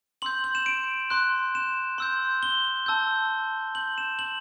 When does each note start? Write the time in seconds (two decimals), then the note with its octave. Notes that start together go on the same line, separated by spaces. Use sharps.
0.22 C6 E6 G6 F#7
0.44 F#7
0.55 E7
0.66 D7
1.10 C6 F#6
1.55 E7
1.98 C6 E6 G6
2.43 G7
2.86 A5 E6 G6
3.75 C6 G6 F#7
3.98 E7
4.19 F#7